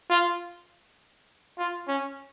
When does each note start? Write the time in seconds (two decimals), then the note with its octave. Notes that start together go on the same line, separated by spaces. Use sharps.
0.10 F4
1.58 F4
1.88 C#4